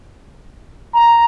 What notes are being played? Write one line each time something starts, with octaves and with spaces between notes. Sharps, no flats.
A#5